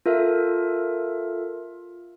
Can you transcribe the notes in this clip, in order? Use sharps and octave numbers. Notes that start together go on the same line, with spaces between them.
F4 A4 A#4 E5